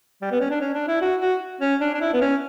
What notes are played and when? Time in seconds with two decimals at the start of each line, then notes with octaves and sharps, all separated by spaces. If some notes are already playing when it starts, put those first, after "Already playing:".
0.22 G3
0.32 B3
0.40 C#4
0.50 D4
0.60 C#4
0.74 D4
0.88 E4
1.01 F#4
1.20 F#4
1.61 C#4
1.81 D4
1.94 D4
2.01 E4
2.13 B3
2.21 C#4